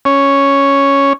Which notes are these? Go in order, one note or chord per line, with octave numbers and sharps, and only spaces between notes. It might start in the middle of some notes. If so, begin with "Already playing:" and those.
C#4